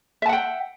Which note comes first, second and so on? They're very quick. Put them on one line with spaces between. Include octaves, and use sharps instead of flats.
E5 A5 F#5 G5